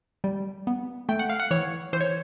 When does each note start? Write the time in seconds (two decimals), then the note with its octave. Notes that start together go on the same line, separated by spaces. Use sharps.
0.24 G3
0.67 B3
1.09 A3 G5
1.19 F#5
1.30 F5
1.40 F#5
1.51 E3 C#5
1.93 E3 C5
2.01 C#5